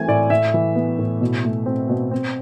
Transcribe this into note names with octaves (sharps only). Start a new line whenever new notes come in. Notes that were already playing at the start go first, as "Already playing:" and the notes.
Already playing: E3 A3 C4 G#5
A2 D5
A2 E5
E3
B3
A2
B2
A3
C4
B2
C4